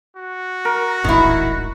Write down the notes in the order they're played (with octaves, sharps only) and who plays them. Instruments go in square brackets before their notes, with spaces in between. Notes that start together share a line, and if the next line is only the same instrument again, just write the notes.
[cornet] F#4
[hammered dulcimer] A#4
[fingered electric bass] D1 A1 G#2 [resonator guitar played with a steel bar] D#3 E4